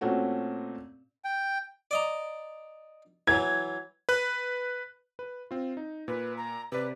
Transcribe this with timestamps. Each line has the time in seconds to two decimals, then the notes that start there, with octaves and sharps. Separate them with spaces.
0.01 A#2 A3 C4 C#4 F#4
1.24 G5
1.91 D5 D#5 A#5
3.27 E3 F#3 G#6
4.09 B4 F#6
5.19 B4
5.51 C4 F4
5.77 D#4
6.08 A#2 B4
6.37 A#5
6.72 C3 B4 D5